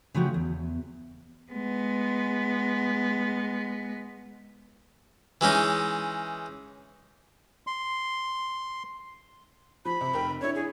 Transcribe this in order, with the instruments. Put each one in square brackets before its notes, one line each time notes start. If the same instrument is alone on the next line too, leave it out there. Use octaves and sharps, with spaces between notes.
[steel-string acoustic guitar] C#3 F3 A3 C#4 F#4 G4
E2
[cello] G#3 B3
[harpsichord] E3 G#3 C#4 D#4
[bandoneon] C6
[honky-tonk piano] F3 [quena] B5
[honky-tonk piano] C3
F1 A#4 G5
[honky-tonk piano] D4 E4 [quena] C#5
[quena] G#4